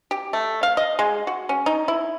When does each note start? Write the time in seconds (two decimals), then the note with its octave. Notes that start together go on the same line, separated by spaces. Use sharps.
0.11 G4
0.33 A3
0.63 F5
0.77 D#5
0.99 G#3
1.27 F#4
1.49 C#4
1.66 D#4
1.88 E4